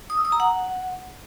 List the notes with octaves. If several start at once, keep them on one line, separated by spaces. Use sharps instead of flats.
D#6
E6
D#6
A#5
F#5